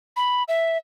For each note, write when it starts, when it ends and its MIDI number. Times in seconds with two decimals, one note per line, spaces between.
0.16 0.43 83
0.48 0.78 76